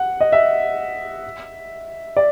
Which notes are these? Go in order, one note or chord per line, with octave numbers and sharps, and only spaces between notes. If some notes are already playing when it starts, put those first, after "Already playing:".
Already playing: F#5
D#5
E5
D5